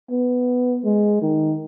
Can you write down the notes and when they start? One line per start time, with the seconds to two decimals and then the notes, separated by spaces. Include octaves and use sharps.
0.10 B3
0.85 G#3
1.22 D#3